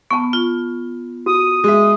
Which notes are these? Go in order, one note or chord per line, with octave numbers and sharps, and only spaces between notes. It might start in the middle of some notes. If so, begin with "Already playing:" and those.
B3 A5 C#6
F4
F#4 D#6
G#3 E5